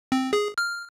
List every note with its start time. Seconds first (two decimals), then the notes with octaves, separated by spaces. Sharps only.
0.12 C4
0.33 G#4
0.58 F6